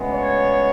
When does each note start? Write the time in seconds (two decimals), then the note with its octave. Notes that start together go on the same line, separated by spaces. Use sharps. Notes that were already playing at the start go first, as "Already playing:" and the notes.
Already playing: D2 C#3 G#3 B3
0.11 C#5